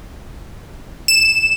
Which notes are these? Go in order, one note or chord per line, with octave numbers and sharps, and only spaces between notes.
E7